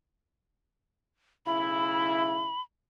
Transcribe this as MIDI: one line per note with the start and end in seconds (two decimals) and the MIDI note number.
1.46 2.52 35
1.46 2.52 49
1.46 2.52 64
1.46 2.61 83